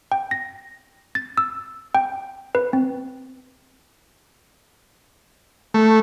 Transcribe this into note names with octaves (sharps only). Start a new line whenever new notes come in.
G5
A#6
A6
E6
G5
B4
C4
A3